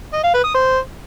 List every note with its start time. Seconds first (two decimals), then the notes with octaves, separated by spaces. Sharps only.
0.13 D#5
0.24 F5
0.34 B4
0.44 D#6
0.54 C5